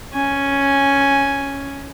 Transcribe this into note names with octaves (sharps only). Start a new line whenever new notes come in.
C#4 G#5